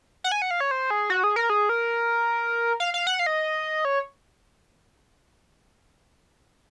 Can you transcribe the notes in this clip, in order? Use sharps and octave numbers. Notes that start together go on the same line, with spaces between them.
F#5
G#5
F#5
F5
C#5
C5
G#4
F#4
G#4
A#4
G#4
A#4
F5
F5
F#5
F5
D#5
C#5